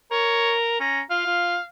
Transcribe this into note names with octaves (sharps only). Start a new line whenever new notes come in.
A#4 C#5
C#4 A#5
F4 F5
F4